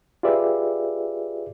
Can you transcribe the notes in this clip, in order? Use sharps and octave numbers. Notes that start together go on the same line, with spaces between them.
F4 G4 G#4 B4 D5 E5